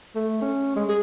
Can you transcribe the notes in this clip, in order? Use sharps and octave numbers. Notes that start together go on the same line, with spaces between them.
A3
C#4
G#3
G#4